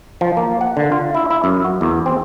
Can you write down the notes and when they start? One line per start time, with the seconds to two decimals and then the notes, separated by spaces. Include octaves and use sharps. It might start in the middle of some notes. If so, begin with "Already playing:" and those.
0.21 F3
0.37 A#3
0.61 F#5
0.77 D3
0.92 F4
1.15 E4
1.30 E4
1.44 F#2
1.64 F#4
1.81 E2
2.06 C4